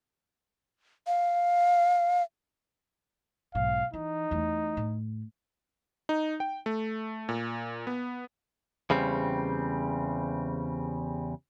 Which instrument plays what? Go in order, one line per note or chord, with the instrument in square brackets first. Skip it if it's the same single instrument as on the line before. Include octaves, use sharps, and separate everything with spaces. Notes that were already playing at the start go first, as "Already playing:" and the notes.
[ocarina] F5
[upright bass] B1 G#2 [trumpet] F5
[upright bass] E3 [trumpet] D#4
[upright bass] E2 A3
A2
[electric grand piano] D#4
G5
A3
A#2
B3
[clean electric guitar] E2 C#3 G3 C4